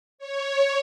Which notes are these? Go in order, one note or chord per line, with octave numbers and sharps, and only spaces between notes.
C#5